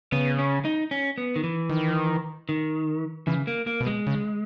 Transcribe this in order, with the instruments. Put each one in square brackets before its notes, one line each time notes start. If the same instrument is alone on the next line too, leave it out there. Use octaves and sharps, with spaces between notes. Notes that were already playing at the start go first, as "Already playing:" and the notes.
[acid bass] C#3 [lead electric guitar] B3
[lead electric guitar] C#4
D#4
C#4
B3
D#3
E3
[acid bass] D#3
[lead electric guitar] D#3
[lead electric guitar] C#3 [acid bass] E3
[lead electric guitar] A#3
A#3
[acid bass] B2
[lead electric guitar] G#3
[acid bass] C#3